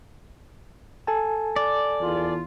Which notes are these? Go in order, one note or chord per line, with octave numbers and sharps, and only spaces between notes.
A4 G#5 A5
D5
E2 F4